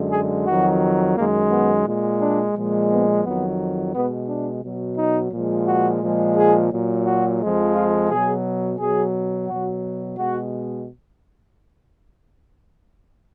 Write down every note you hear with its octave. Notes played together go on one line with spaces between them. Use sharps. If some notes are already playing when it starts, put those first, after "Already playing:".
Already playing: F#2 D3 G#3
G#4
F2 D#3 F#3 F#4
F#2 D#3 G#3 A#3
B3
A#2 G#3
D4
A#2 F3 G#3
B3
F2 D#3 F#3 B3
B2 G#3 B3
D4
B2 F#3
D#4
A#2 F3 G#3
F#4
A#2 F3 G#3
G#4
A#2 F#3
F#4
F2 F3 G#3
F4
B2 F#3 G#4
B2 F#3 G#4
B2 F#3 F#4
B2 G#3 F#4